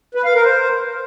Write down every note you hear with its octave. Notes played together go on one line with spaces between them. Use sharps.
B4
F5
A#4
C5